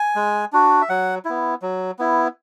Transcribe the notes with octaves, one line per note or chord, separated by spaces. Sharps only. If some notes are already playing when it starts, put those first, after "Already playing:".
Already playing: G#5
G#3
D4 F#4
E5
F#3 F#5
B3 E4
F#3
B3 E4